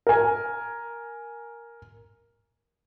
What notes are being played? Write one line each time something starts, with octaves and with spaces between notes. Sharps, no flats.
A#4 G#5